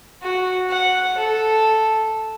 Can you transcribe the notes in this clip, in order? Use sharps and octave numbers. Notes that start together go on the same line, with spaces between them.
F#4
F#5
A4